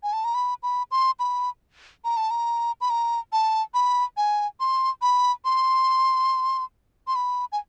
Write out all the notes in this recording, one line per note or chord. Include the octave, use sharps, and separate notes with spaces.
G#5
A5
A#5
B5
B5
C6
B5
A#5
A5
A#5
B5
A#5
A5
B5
G#5
C6
B5
C6
C6
B5
G#5